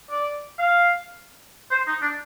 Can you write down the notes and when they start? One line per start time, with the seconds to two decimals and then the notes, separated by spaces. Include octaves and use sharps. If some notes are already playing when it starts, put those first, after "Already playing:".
0.10 D5
0.59 F5
1.71 C5
1.87 D#4
2.02 D4